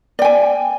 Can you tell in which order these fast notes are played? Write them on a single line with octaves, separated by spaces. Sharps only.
D5 G5 G#5